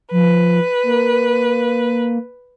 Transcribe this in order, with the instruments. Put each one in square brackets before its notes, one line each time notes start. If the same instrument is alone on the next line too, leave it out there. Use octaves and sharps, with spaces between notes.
[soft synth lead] F3 [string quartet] B4
[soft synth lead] A#3